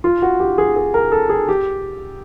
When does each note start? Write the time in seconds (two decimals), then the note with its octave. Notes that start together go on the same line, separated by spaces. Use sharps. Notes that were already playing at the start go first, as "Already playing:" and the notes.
0.04 F4
0.22 F#4
0.40 G4
0.58 G#4
0.76 G#4
0.94 A#4
1.12 A4
1.29 G#4
1.49 G4